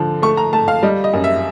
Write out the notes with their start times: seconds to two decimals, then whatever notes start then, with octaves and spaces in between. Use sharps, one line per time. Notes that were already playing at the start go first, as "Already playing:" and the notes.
Already playing: D3 F3
0.22 A3 C#6
0.37 A#5
0.53 A3 A5
0.68 F5
0.83 G3 D#5
1.04 D#5
1.13 F#2
1.24 E5